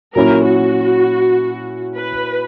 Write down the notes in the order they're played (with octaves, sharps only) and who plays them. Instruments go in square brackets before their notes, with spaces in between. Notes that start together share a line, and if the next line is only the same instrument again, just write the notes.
[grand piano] A#2 F#3 C#4 E4 [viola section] A#4
[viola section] F#4
B4